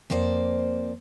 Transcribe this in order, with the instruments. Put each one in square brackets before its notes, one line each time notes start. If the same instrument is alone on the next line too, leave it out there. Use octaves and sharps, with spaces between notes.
[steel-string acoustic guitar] F2 A#3 C5 D5